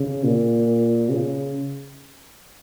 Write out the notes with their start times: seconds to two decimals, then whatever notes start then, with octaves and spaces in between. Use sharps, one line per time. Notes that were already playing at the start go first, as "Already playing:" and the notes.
Already playing: C#3
0.24 A#2
1.10 C#3